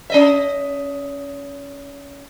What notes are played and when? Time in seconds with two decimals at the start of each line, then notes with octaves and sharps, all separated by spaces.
0.10 C#4 D#5 E5